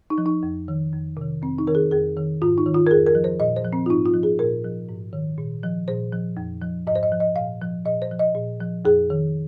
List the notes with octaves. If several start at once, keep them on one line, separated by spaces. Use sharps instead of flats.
D#4
F3
D#4
F2
D#3
F2
C3 D#3
F2 C4
D#4
D#3 A#4
G#4
F2 G#4
D#3
G#2 F4
D#4
D#3
F4
A#4
F2 G#4
A#4
F3
C5
A#2 D#5
C5
F3
C4
F4
G#2 D#4
F4
F3
G#4
A#2 A#4
F3
G#2
D#3
A#2
F3
A#2 C5
F3
F2
F3
G#2 D#5
C5
D#5
F3
D#5
A#2 F5
F3
A#2 D#5
C5
F3
D#5
A#2
F3
F2 G#4
D#3